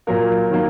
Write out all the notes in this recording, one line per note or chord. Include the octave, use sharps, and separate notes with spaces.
A#2 F#3 A#3 A#4
D#3 F#3 A#3